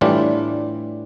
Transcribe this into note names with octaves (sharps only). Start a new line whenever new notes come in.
A2 E3 G3 D4 F4